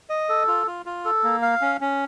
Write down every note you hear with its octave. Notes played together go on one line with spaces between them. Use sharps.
D#5
A4
F4
F4
F4
A4
A#3
F5
C#4
C#4